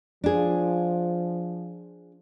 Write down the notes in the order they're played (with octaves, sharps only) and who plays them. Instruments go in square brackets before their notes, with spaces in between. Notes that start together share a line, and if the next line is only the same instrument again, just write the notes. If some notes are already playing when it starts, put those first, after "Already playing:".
[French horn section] F3 [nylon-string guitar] D4 G#4